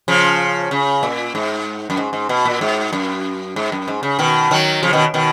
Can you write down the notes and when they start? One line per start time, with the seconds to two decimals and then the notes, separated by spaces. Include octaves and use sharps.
0.08 C#3 F3
0.71 C#3
1.03 A#2
1.35 G#2
1.90 F#2
1.97 G#2
2.13 G#2
2.29 B2
2.45 A#2
2.61 G#2
2.93 F#2
3.56 G#2
3.72 F#2
3.88 G#2
4.03 C#3
4.19 B2 D#3
4.51 D#3 F#3
4.83 C#3 F3
4.93 B2 D#3
5.14 B2 D#3